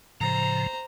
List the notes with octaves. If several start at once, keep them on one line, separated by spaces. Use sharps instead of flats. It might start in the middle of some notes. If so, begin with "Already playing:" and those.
A2 C#3 F3 C5 A#5